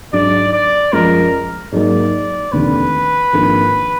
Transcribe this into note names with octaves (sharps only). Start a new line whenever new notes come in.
G#2 F#3 D4 D5
D5
F#2 F3 G#3 A#4
G#2 F#3 A#3 D#4 D5
F1 D#2 D3 B4
G#1 G#2 F3 A#3 D4